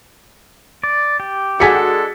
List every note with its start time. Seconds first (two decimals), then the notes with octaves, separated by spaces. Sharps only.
0.84 D5
1.20 G4
1.60 G#3 D4 F#4 G#4 A4 G#6 B6 C#7